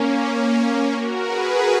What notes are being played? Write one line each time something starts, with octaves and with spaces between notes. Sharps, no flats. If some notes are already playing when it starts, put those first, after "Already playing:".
Already playing: A#3 C#4
F#4 A#4
G#4 B4